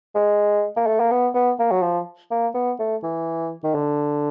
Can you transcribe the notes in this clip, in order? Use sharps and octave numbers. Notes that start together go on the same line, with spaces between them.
G#3
A#3
A3
A#3
B3
B3
A#3
F#3
F3
A#3
B3
A3
E3
D#3
D3